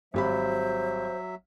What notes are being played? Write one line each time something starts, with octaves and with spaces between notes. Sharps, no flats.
G#1 F#3 G3 C5 E5 B5